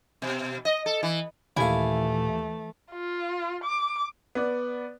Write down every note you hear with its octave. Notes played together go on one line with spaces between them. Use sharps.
B2
D#5
A4
E3
D#2 A#2 E3 A3 E4 F5 G#5
F4
D6
B3 D5